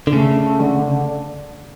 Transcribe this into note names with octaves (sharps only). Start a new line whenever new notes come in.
D3
C#3 A3
D3